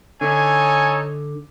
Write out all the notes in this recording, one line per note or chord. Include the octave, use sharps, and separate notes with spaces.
D3 D#4 A4 C#5 G#5